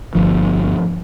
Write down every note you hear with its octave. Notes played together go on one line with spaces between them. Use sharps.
G1 F3